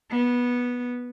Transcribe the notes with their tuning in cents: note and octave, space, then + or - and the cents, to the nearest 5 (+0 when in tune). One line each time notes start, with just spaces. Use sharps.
B3 -15